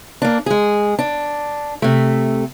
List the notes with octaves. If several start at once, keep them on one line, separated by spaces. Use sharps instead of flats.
A#3 D4
G#3 G#4
D4
C3 A3